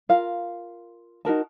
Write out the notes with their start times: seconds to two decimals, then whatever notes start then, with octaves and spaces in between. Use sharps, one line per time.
0.09 F4 A#4 F5
1.25 D#4 F#4 A#4 A5